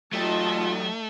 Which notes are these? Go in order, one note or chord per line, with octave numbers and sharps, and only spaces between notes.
F#3 A3 D#4 F4 G4 D#5 A5